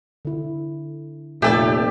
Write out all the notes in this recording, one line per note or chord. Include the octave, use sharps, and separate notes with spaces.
D3 E4
F1 A#2 A3 G4 A4 D5 E5